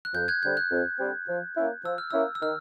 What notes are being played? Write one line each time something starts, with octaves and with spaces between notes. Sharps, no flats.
F#6
F2 G6
F#6 G#6
D3 G3 C4 G6
F#6
F2
D3 G3 C4
F3
A#3 C#4 E4
F3 E6
F6
A#3 C#4 E4 E6
E6
D#3 F6